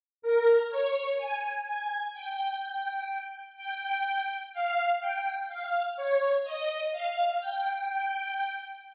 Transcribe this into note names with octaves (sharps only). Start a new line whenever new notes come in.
A#4
C#5
G#5
G#5
G5
G5
F5
G5
F5
C#5
D#5
F5
G5